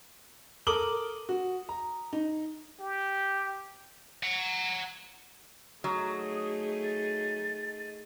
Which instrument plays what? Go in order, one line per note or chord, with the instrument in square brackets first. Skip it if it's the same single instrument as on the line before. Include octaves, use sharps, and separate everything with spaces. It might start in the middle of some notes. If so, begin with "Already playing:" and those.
[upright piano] A4 A#4 D6 D#6 F#7 G7
F#4
A#5
D#4
[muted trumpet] G4
[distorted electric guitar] F#5 A#5
[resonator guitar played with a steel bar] F#3 [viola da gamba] A3 D#4 G#4 [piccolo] D#6
[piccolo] A6